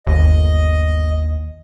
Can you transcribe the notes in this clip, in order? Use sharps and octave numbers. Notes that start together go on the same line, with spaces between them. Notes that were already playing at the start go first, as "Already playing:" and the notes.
G1 D#2 D#5